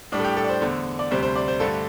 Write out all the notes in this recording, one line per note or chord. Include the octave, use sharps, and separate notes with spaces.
A2 G3 D4
A4
G4
A4
D5
C5
E2 D3 A3
D5
D2 C3 G3 C5
C5
D5
C5
G2 D3 A3 A4